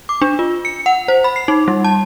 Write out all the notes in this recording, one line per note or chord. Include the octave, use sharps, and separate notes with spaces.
D6
D4
F4
C#7
F#5
C5
B5
C7
D#4
G3
A5